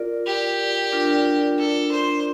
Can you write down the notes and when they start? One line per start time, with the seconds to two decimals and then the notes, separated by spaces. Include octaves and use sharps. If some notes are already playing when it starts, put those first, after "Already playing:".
Already playing: F4 A#4 D5
0.27 G4
0.92 D4 F4 A#4 D5
1.59 A4
1.91 C5